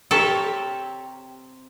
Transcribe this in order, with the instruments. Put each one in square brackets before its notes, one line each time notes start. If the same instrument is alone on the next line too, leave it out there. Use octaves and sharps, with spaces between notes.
[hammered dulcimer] C3 [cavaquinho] G4 A#4 C#5 [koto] A4